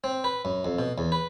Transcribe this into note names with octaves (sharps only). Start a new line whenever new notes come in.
C4
B4
F#2
F2
B2
E2
B4